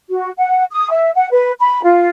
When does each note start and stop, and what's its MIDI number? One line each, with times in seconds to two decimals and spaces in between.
0.09 0.31 66
0.37 0.64 78
0.71 0.90 87
0.91 1.11 76
1.15 1.28 78
1.31 1.52 71
1.60 1.81 83
1.83 2.08 65